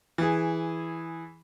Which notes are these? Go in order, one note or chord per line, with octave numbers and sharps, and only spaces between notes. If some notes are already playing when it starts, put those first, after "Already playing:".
E3 G#4